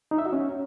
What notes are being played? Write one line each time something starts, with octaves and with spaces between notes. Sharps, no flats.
D#4
E5
F#4
C#4